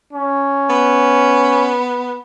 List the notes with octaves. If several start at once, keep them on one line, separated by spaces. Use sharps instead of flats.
C#4
B3